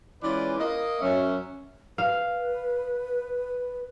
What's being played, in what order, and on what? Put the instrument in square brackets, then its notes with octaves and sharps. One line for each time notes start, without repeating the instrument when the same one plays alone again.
[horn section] E3 G#3 C#4 F4 B4 D5
A#3 D#5
F#2 C#4 E5
[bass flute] B4 [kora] F5